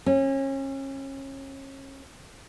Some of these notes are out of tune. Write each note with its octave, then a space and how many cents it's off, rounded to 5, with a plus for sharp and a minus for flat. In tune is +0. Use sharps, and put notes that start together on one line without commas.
C#4 -30